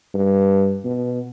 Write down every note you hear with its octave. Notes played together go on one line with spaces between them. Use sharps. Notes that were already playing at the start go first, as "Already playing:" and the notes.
G2
B2